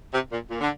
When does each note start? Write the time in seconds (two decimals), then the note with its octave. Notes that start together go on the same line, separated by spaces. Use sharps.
0.12 C3
0.31 A#2
0.50 A#2
0.60 D3